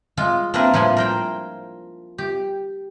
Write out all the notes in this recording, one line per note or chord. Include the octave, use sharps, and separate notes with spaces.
G#3 F4
A#3 C4 D4 E4 A#4 B4
A2 F3 E4 G#5 B5 C6
A#4 C5 G5
G4